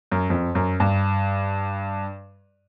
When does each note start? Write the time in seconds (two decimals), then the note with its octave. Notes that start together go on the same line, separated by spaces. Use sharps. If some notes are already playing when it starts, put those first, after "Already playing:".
0.12 F#2
0.30 F2
0.55 F#2
0.80 G2